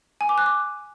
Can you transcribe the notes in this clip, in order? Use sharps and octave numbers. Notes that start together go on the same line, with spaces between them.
G#5
D6
F#6
D6